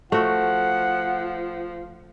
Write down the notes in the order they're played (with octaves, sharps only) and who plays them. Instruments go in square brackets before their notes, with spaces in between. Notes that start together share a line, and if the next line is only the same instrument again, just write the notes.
[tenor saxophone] F3 [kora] A3 F#4 [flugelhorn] F#5